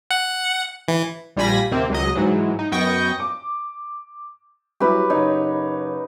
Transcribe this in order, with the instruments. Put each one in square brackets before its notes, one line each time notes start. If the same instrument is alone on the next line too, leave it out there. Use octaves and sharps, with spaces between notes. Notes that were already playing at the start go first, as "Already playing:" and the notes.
[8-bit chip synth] F#5
E3
[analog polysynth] A#1 G3 F4 G#5 B5 A#6
D#2 C3 A#3 C4
C#2 F#3 D#5
G#2 E3 F#3
D#4
F#2 B3 D#5 G5 C#6 A#6
[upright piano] D6
[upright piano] F#3 G3 E4 [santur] G4 B4
[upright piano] F#1 C#5 [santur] D#4